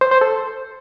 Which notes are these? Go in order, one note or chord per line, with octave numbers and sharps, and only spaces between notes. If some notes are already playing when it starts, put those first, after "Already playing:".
C5
C5
A4